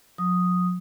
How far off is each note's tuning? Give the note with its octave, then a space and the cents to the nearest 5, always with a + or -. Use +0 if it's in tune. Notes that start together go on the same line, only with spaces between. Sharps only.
F#3 -45 D#6 +0